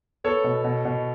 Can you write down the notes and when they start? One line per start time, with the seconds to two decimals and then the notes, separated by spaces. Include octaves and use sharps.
0.24 B3 A4 C#5
0.44 B2
0.64 B2
0.85 B2